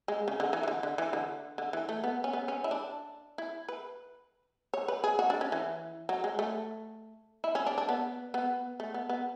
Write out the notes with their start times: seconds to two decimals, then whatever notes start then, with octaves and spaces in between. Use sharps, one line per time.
0.08 G#3
0.28 C#3
0.40 D3
0.53 E3
0.63 E3
0.68 D3
0.83 D3
0.98 E3
1.13 D3
1.58 D3
1.73 E3
1.89 A3
2.04 B3
2.24 C#4
2.33 B3
2.48 C#4
2.64 E4
2.71 D4
3.38 E4
3.69 B4
4.74 C#5
4.88 B4
5.04 G#4
5.19 F#4
5.30 D4
5.41 C#4
5.52 E3
6.09 F#3
6.24 G#3
6.39 A3
7.44 E4
7.55 C#4
7.66 D4
7.78 D4
7.89 B3
8.34 B3
8.80 A3
8.94 B3
9.09 B3